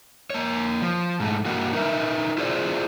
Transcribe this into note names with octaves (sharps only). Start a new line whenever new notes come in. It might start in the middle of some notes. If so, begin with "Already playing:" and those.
A#3 C#5
F3
G#2 A3
G2 E3 A#3 F#4
D#4 A#4 B4 E5
E4 F4 G#4 C5 D5